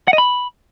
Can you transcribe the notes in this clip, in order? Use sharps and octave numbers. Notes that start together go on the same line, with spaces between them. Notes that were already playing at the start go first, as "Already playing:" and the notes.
F#5
D#5
B5